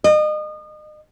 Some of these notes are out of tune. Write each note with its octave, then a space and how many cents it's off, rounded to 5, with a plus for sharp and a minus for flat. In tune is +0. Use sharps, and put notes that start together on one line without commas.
D#5 -35